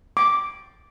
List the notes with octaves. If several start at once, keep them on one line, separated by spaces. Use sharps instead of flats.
D6